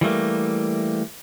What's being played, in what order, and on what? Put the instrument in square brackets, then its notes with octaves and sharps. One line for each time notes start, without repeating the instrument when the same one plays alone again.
[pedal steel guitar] E3 G3 A3 A#3